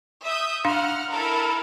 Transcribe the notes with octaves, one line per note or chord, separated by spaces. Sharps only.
E5 D#6 G6
D4 F5 F#5 C6 F6
E4 A4 A#4